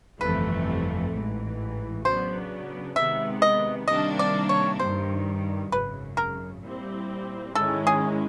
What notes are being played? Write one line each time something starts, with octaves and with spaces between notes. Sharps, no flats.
G1 F2 C3 E3 A3 B4
A1 G#2 E3
C#3 F#3 B3 D4 C5
C3 D#3 G#3 B3 E5
D#5
C3 D#3 G3 A#3 D4 D#5
D5
C#5
G2 D#3 G3 C5
G#1 F#2 C#3 B4
A#4
A#2 G3 C4 E4 G4
G#2 D#3 G#3 C#4 E4 A4
G#4